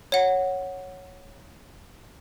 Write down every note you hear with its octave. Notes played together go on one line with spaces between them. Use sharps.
C#5 F#5